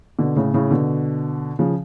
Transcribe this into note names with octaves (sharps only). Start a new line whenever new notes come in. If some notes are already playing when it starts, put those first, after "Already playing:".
B2 D3
A2 C#3
A2 C#3
B2 D3
C#3 F3